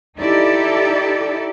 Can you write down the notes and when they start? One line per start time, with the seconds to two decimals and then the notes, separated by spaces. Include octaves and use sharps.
0.19 D#4 E4 G4 A4 D5